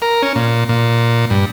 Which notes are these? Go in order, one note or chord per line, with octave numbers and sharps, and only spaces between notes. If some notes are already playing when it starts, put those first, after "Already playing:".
A#4
C#4
A#2
A#2
G2